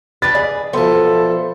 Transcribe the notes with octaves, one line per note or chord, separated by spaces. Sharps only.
D4 G4 B4 A6
G#4 D5
B1 F3 B3 E4 A4 C5